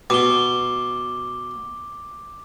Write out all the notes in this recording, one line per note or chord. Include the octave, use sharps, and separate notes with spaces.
B2 D6 G7